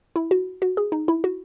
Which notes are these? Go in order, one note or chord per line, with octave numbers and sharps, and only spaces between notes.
E4
F#4
F#4
G#4
D#4
E4
F#4